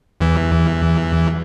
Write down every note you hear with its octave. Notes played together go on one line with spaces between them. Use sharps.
E2 E3